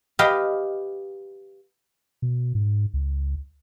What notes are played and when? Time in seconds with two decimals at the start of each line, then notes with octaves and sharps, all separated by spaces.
0.19 G4 B4 D#5 F5 G5
2.22 B2
2.55 G#2
2.94 C#2